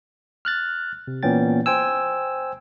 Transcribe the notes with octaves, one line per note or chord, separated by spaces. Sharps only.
F6 F#6 A6
C3
A#2 E3 B3 C#4 G5 A6
C5 G5 G#5 E6